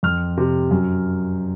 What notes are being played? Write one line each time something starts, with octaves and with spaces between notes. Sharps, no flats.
F2 F6
C3
F#2